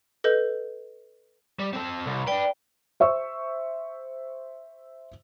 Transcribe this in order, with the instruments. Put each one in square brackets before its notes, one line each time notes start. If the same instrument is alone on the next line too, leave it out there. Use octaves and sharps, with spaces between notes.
[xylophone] A4 B4 D#5 G6
[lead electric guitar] G3
C4 A4
C2
[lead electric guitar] D4 B4 [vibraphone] D5 G5
[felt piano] C5 E5 C#6 E6